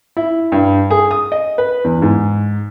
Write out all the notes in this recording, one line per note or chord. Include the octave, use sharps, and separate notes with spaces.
E4
G2
G#4
D#6
D#5
B4
E2
G#2